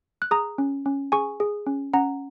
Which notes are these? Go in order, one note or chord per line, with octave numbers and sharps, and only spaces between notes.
F#6
G#4 A#5 D#6
C#4
C#4
G#4 G#5 C#6
G#4
C#4
C#4 F#5 A#5